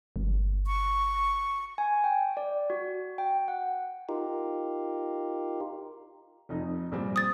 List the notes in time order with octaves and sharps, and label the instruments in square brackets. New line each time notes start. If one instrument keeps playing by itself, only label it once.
[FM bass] G1
[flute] C#6
[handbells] G#5
G5
D5
F#4
G5
F#5
[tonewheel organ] D#4 F4 G4 A#4
[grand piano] F1 F2 D#4
A#1 G3 C4
[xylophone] D#6 A6